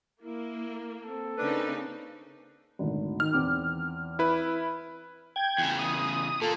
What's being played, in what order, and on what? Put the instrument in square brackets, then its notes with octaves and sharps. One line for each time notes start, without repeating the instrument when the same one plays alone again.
[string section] A#3 [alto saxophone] E4
[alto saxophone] C4 [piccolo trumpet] A4
[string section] C#3 A#3 D#4 [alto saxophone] C4 [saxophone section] D4 B4
[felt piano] G#1 D2
[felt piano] D#3 [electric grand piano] F6
[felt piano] E2 C4 D6
[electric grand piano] E4 B4
[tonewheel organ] G5 G#6
[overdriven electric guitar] E2 C#3
[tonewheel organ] D#6
[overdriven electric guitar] A#2 A#3 [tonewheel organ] A4